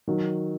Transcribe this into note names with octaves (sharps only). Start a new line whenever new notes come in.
D#3 F#3